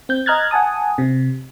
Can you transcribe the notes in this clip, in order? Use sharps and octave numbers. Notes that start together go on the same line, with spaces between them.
C4 G6
D#5 A#5 F6 F#6 G#6 A6
F#5 G#5 A5 D#6
C3